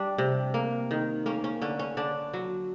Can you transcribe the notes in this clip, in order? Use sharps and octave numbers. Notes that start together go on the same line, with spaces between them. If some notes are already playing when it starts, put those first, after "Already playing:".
Already playing: G3 D4
C3
A#3
D#3
A#3 C#4
C#4
D3 C#4
C#4
D3 D4
F#3